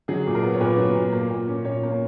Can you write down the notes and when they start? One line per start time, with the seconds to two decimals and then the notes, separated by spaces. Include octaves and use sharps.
0.08 F#3 G#4
0.27 A#2
0.35 A#4
0.43 B3
0.53 C#5
0.60 A#2 B4
0.78 F#3
0.96 A#2
1.12 A#3
1.30 A#2
1.48 C#4
1.65 A#2 C#5
1.83 A#3